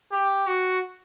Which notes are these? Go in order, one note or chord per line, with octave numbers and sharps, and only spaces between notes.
G4
F#4